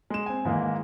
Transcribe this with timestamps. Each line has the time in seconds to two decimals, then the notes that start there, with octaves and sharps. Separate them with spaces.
0.10 G#3 E7
0.26 C4 G#5
0.45 G#2 D#3 E3 G#3 A#3